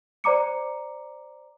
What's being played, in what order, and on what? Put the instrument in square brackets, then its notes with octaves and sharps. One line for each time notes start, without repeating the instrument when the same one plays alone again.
[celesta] C5 D5 A#5 D6 C#7